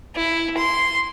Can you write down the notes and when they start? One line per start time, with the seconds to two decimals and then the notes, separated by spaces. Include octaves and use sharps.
0.16 E4
0.57 C6